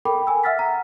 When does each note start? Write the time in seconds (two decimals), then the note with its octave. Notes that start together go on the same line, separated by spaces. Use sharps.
0.05 A4 A#4 G5 B5 D6
0.27 G#5 E6
0.44 E5 F#5 E6 F6 A6 B6
0.59 A#5